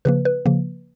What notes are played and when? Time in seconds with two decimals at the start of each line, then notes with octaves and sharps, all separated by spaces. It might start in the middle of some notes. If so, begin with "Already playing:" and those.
0.05 C#3 F3 A#3 B4
0.25 B4
0.46 C#3 F3 A#3